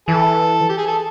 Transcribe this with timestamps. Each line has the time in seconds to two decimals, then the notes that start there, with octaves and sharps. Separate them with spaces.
0.08 E3 A4
0.69 G4
0.78 G#4
0.87 A4